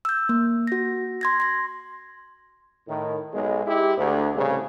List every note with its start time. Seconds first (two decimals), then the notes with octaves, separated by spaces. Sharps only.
0.05 E6 G6
0.29 A#3
0.67 F#4 A#6
1.21 C6 G#6 A#6
1.40 C6 A#6
2.88 A2 D#3
3.33 B1 G#3
3.66 G#3 E4 G4
3.97 D2
4.35 C2 A2 C#3